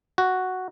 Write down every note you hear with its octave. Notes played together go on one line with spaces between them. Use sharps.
F#4